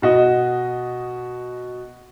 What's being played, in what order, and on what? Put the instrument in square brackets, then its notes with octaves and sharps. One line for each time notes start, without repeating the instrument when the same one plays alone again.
[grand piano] B2 F#4 D#5